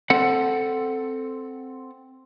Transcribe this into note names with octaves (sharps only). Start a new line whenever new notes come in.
C4 A4 F#5